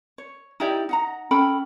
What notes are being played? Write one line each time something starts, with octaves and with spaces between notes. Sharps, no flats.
C#5
D#4 E4 G4 D5
D#4 F#5 A#5
C#4 A4 G5 B5